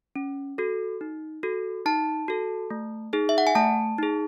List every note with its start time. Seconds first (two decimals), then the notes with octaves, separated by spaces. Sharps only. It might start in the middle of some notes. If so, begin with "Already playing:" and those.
0.16 C#4
0.58 F#4 A4
1.01 D#4
1.43 F#4 A4
1.86 D#4 A5
2.28 F#4 A4
2.70 A3
3.13 D#4 G#4
3.29 E5
3.38 F#5
3.47 G#5
3.55 A3 A5
3.98 D#4 G#4